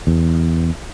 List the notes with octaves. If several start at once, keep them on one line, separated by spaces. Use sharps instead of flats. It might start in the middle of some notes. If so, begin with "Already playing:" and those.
E2